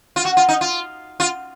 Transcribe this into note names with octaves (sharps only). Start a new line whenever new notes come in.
F4
F#4
F4
D#4
F4
F4